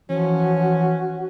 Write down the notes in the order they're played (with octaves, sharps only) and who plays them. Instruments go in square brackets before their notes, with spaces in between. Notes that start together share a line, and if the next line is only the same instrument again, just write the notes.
[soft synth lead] E3 [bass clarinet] F3 [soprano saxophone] C#4 [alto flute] F#4